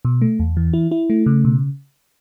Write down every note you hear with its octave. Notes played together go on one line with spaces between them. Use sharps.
B2
A3
E2
E3
E4
E4
A3
C#3
B2